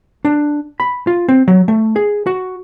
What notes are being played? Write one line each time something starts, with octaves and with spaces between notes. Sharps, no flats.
D4
B5
F4
C4
F#3
A3
G#4
F#4